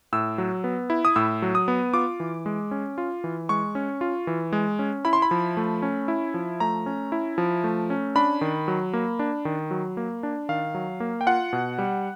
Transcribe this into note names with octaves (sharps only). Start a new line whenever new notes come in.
A2 E6
F#3
B3
E4
D#6
A2 E6
F#3
D#6
B3
F4 D6
E3
G#3
C#4
F4
E3
G#3 C#6
C#4
F4
E3
G#3
C#4
E4 B5
C6
B5
F3
A3
C#4
E4
F3
A3 A#5
C#4
E4
F3
A3
C#4
D4 B5
D#3
F#3
A#3
D4
D#3
F#3
A#3
D4
D#3 F5
F#3
A#3
G5
F4 F#5
B2
G3